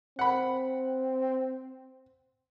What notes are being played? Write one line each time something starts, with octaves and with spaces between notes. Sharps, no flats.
C4 F#5 B5